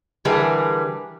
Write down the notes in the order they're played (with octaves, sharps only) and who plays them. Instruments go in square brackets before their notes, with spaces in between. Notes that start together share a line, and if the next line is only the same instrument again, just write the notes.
[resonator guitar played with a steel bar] D3 E3 G3 G#4 A#4 B4